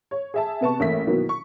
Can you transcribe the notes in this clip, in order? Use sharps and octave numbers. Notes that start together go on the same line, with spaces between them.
C#5
G#4 E5 A5
C3 B3 A5 C#6
A1 A3 A#3 B6
B2 D#3 E3 F#3 A#3
C#6